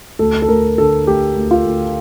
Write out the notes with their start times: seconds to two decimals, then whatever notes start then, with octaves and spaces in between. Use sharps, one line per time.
0.19 D2 A4
0.42 A4
0.48 D2 A#4
0.78 D3 A4
1.07 A3 G4
1.36 D2
1.51 F4
1.65 D2